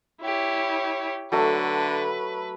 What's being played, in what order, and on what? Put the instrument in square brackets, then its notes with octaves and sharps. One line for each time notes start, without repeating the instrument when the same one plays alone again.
[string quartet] E4 G4 C#5
[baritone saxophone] D3 [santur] F#3 A3 [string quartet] B4